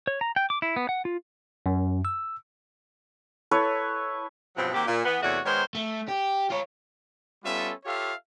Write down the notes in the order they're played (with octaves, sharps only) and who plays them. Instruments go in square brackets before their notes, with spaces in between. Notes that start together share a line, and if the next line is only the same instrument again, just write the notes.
[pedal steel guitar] C#5
A#5
G5
D6
E4
B3
F#5
F4
[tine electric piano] F#2
E6
[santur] E4 A4 B4 C#5
[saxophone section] G2 B2 F3 F#3 B3 C4
D#3 A#3 C4 F#4 G4
A#2
E3 B3
E2 C3 A3 F#4 C#5 D5
D#3 G#3 B3 A#4 C5 C#5
[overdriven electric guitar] A3
G4
F4 C#5
[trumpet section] G3 B3 C#4 F4 A4 E5
F4 G4 A4 C#5 E5 F5